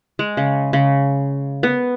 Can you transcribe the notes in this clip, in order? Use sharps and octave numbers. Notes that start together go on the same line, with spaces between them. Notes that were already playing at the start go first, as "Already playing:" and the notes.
G#3
C#3
C#3
B3